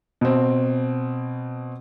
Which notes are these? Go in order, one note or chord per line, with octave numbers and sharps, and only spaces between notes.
B2 C4